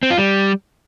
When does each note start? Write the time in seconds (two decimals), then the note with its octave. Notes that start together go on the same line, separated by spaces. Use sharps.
0.03 C4
0.10 F4
0.18 G3